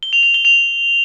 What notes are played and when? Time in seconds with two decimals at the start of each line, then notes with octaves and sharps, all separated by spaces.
0.03 G7
0.13 F7
0.23 F7
0.34 G7
0.45 F7